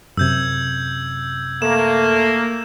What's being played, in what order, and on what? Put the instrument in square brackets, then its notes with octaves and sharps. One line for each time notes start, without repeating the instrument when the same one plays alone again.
[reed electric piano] F#2 C3 [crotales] E6 G6 G#6
[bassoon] A3 [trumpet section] A#3 [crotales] E7